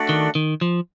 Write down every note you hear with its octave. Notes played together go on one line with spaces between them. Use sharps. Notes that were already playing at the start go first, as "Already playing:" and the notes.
Already playing: A3 D4 F#4 A4 D5
D#3
D#3
F3